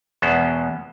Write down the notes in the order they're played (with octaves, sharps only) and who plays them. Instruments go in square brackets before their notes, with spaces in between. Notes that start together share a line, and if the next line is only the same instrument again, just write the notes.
[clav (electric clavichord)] E2 B2 G#3 B3 C#4 C5